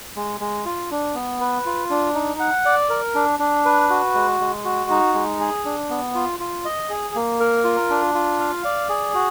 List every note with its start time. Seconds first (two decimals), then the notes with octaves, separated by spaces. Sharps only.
0.16 G#3
0.40 G#3
0.65 F4
0.91 D4
1.15 B3
1.41 B4
1.66 F4
1.90 D4
2.15 D#4
2.40 F#5
2.65 D5
2.90 A#4
3.15 D4
3.39 D4
3.65 B4
3.90 F#4
4.15 G#3
4.40 G#3
4.65 F#4
4.90 D#4
5.14 G#3
5.40 G#4
5.65 D4
5.90 B3
6.15 F4
6.40 F4
6.65 D#5
6.90 G#4
7.15 A#3
7.40 A#4
7.64 F4
7.90 D4
8.15 F4
8.40 F5
8.65 D5
8.89 G#4
9.14 F#4